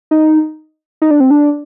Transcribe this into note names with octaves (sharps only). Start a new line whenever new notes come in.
D#4
D#4
D4
C4
D4